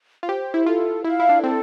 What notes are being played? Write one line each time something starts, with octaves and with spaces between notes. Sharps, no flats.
F4
G4 C5
E4
F4 A4
E4 F5
E4
D4
C4 A4